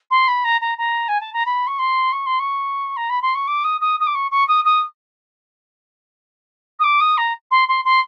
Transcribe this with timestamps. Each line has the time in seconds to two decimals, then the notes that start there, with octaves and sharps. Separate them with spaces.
0.10 C6
0.28 B5
0.44 A#5
0.61 A#5
0.78 A#5
1.08 G#5
1.20 A5
1.33 A#5
1.46 B5
1.67 C#6
1.79 C6
2.12 C#6
2.26 C6
2.39 C#6
2.96 A#5
3.09 B5
3.22 C6
3.35 C#6
3.47 D6
3.64 D#6
3.81 D#6
4.00 D#6
4.07 D6
4.15 C#6
4.31 C#6
4.48 D#6
4.64 D#6
6.79 D#6
6.84 D6
7.00 D#6
7.17 A#5
7.51 C6
7.68 C6
7.85 C6